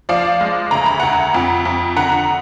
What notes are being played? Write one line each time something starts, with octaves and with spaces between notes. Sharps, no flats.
F3 D5 F5
G#3
D2 A#5
B5
D2 F#5 A#5
F2
F2
D3 F#5 A#5